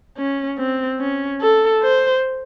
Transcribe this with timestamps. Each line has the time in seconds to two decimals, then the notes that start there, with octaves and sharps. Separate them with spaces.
0.18 C#4
0.59 C4
1.00 C#4
1.41 A4
1.83 C5